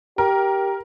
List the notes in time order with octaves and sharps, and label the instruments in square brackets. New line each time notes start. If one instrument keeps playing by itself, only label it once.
[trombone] G4 [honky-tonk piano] A#4